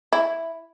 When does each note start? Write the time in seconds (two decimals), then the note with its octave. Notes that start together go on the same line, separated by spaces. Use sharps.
0.13 E4